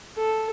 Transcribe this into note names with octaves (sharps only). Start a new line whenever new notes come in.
A4